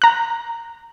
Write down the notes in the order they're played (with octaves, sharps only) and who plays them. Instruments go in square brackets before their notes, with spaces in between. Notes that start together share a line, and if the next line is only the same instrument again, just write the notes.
[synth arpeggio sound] A#5 F#6